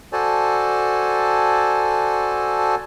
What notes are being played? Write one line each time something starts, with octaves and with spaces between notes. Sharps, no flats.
F#4 A4 C5 D5 G#5 A5